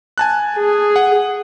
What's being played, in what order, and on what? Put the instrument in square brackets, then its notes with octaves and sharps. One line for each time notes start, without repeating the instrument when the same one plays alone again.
[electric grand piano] G#5 A5 F#6
[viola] G#4
[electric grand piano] F#5